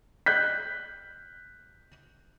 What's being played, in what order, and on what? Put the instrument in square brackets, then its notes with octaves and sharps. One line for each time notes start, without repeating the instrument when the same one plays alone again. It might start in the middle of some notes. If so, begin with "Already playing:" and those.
[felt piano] F#6 G6 B6